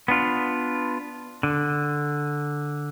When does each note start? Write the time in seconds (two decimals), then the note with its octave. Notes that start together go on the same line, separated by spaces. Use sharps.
0.08 B3 D4 F4
1.43 D3